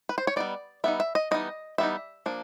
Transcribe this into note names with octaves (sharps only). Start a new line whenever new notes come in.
B4
C5
C#5
G3 B3 D#4 D5
G3 B3 D#4 E5
E5
D#5
E3 G3 B3 D#4 D#5
E3 G3 B3 D#4 E5
F3 A#3 D4